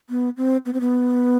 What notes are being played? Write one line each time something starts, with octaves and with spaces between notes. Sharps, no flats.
B3
C4
B3
C4
B3